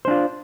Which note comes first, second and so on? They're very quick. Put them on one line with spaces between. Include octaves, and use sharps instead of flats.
C5 D4 F4